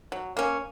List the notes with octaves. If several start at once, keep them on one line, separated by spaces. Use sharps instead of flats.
F#3
A#3 C#4